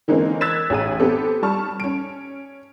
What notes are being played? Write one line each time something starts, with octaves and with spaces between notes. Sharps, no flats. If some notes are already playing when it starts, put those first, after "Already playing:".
D3 E3 G#3 A#3 C4 C#4
E6 F#6 G#6 A6 B6 E7
A1 G#4 D#7
B3 C4 G4 A4
G3 A5 C#6 F6
C#4 D7